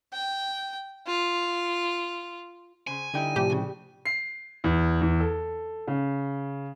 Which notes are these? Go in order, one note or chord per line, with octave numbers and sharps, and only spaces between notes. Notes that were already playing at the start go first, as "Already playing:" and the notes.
G5
F4
C#3 C5 G#5
D3 G3 D#4 E4 G5 G6
A2 C3 F3 G4
C#3
C7
E2
E2
A4
C#3